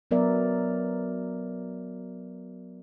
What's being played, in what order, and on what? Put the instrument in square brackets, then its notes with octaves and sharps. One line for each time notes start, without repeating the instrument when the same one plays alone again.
[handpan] F#3 B3 A#4 D5 E5